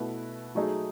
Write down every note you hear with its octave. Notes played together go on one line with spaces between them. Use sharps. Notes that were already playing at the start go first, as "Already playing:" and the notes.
Already playing: B2 A3 E4 B4
F#3 A3 D#4 G#4